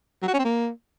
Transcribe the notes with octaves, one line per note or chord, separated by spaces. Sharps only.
F#3
F#4
C#4
C4
A#3